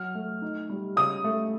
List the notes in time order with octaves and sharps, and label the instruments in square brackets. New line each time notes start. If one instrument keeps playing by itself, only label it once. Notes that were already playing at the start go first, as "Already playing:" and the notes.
Already playing: [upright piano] F#3 F6
A3
D#4
G3
C#3 D#6
A3